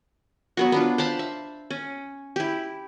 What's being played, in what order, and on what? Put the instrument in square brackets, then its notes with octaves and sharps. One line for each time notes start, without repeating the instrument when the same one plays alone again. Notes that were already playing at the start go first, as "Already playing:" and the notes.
[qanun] F#3 B3 F#4
B3 D4 F4
C5 F5 A5 B5
E5
C#4
E4 G4